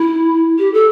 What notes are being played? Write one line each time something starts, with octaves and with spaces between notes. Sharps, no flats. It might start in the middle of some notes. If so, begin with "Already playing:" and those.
Already playing: E4
G4
A4